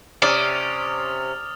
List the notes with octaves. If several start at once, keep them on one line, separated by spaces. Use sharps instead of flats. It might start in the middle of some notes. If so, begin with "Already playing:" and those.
C3 C#4 D5 D#6 F6
A6 F7